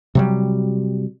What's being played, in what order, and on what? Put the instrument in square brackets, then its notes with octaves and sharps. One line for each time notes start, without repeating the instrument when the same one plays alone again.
[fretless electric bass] C3 F#3 G3